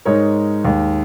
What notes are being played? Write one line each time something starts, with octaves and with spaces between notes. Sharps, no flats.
G#2 G#3 D#4 A#4 C#5
D#2 D#3 G#3